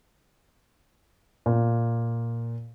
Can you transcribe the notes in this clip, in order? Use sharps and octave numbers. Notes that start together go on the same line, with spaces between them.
A#2